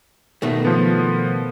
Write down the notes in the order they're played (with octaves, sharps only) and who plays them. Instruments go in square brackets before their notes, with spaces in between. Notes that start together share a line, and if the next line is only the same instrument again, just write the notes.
[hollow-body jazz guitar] B2 D#3 A3
[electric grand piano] F3 B3